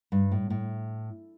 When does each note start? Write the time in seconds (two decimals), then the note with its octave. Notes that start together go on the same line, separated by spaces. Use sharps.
0.12 G2
0.32 A2
0.50 A2